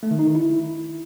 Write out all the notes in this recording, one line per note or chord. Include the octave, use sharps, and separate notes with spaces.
A3
D#3
D#4
D#3
E4